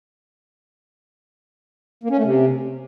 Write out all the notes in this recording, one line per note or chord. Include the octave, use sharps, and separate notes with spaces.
A#3
C#4
A3
C3